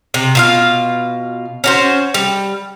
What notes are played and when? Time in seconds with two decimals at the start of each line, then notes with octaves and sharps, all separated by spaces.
0.14 C3
0.35 B2 F4 F5
1.64 C#4 F#4 C5
2.14 G3